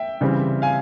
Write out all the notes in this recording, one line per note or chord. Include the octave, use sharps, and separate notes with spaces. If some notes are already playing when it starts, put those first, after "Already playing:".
Already playing: E5 G5
C#3 E3 G3 C4
F5 G#5